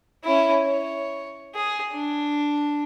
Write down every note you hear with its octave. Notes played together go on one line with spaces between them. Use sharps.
C#4 E4
C#5
G#4
D4